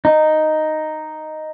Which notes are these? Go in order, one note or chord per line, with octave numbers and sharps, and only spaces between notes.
D#4